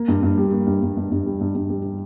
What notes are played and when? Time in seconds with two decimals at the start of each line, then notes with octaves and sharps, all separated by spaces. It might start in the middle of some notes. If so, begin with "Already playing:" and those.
Already playing: A#3
0.08 G2
0.23 G2
0.38 G3
0.52 A#3
0.67 G2
0.82 G2
0.97 G2
1.11 G2
1.26 G3
1.41 G2
1.55 G2
1.70 G3